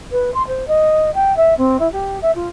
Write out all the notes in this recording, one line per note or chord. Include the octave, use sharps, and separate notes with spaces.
B4
C6
C5
D#5
G5
E5
C4
E4
G4
E5
F4